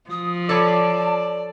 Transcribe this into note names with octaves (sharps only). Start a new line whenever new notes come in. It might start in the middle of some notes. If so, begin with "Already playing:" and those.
F3 D#6
A4 C#5 D5 A5 B5